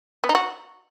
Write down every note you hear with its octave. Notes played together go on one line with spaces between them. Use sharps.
B3
D#4
F#4